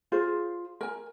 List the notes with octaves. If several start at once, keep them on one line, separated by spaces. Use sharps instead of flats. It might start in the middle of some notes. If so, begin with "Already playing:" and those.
F4 G#4 C5
A#4 G#5